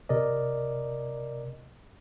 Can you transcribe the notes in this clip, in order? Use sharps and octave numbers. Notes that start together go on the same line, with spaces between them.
C3 A#4 D5 D#5